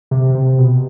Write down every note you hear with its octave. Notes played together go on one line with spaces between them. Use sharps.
C3
C3
B2